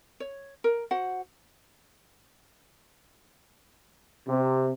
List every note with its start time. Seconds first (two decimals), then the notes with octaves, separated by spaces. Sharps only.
0.20 C#5
0.64 A#4
0.91 F#4 C5 F#5
4.27 C3